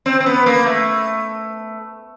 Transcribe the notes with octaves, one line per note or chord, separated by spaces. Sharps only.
C4
C4
B3
A#3
A3